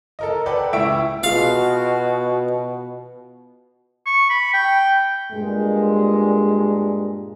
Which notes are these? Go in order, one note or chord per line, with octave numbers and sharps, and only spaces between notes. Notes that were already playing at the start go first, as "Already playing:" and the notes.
A4 A#4 D#5
A4 B4 D5 F#5 G5
C#2 E4 E5 G5 C#6 D7
B2 F4 F#4 G#4 F5
C#6
B5
G5
G2 A#2 G#3